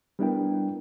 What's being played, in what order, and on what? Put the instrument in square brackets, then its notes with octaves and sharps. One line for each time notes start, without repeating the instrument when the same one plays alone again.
[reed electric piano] G3 B3 D4 E4 A#4 G5